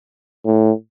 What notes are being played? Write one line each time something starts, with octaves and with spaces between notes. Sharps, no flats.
A2